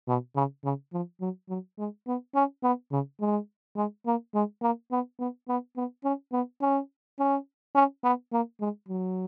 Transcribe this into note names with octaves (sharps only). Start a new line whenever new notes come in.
B2
C#3
C#3
F3
F#3
F#3
G#3
B3
C#4
B3
C#3
G#3
G#3
A#3
G#3
A#3
B3
B3
B3
B3
C#4
B3
C#4
C#4
C#4
B3
A#3
G#3
F#3